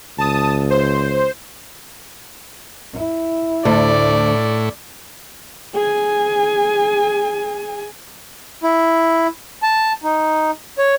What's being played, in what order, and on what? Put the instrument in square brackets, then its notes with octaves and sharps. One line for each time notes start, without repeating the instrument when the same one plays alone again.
[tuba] C#2 [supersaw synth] A5 D#6
[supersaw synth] C5
[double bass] E4
[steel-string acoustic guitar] D2 [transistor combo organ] A2 [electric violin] D5
[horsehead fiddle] G#4 G#5
[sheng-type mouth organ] E4
A5
D#4
C#5